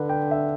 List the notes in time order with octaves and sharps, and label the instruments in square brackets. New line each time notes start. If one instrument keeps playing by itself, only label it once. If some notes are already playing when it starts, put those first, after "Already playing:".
Already playing: [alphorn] D3 [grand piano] B4 F#5
[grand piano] G5
E5